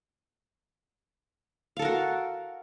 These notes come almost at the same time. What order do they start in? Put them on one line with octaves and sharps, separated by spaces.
F5 A4 A#4 F#4